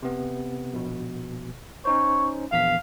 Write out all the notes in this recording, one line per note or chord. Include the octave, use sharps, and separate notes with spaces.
C3 B3
A#1 B2
C#4 D#4 C5 C#5
A#1 E2 F5 B6